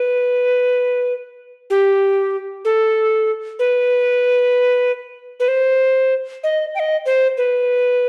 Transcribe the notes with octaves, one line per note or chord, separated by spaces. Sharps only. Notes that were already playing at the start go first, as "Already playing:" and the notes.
Already playing: B4
G4
A4
B4
B4
C5
D#5
G5
D#5
C5
B4